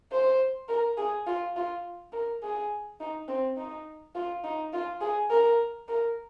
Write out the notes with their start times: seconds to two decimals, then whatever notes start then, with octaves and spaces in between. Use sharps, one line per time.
0.12 C5
0.69 A#4
0.98 G#4
1.27 F4
1.56 F4
2.13 A#4
2.43 G#4
3.00 D#4
3.28 C4
3.57 D#4
4.15 F4
4.44 D#4
4.73 F4
5.01 G#4
5.30 A#4
5.88 A#4